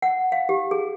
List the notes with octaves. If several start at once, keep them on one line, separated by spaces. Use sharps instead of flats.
F#5
F5
G4
G#4